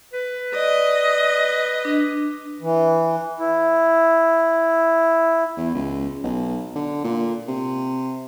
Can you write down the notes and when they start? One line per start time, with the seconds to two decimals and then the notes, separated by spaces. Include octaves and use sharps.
0.14 B4
0.55 D5 D#5
1.85 D4
2.61 E3
3.39 E4
5.57 E2
5.75 C#2
6.23 B1
6.75 D3
7.04 A#2
7.48 C3